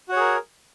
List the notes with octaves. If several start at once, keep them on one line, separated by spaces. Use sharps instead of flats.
F#4 G#4 A#4 C#5